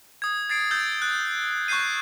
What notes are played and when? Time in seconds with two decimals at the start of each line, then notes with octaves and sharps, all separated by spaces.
0.22 D#6 G#6
0.50 G#6 A6 C7 D7
0.71 E6 G6 A6
1.02 F#6 A6
1.68 C#6 F#6 G6 C7 D#7